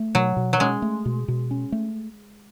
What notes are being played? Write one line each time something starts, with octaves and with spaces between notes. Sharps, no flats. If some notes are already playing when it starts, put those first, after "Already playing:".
Already playing: A3
B2 F#3
B2
F#3
G#3 C#4
A3
B2
B2
C#4
A3